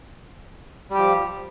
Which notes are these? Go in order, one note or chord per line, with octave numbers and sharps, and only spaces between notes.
F3 G3 G4